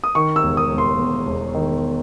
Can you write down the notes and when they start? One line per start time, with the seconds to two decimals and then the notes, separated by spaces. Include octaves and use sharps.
0.04 D#6
0.15 D#3 C#6
0.36 E6
0.43 E1
0.57 D#6
0.71 E1
0.78 C6
0.99 E2
1.27 E1
1.54 D#3